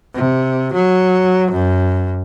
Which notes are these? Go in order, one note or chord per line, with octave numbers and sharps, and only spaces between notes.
C3
F#3
F#2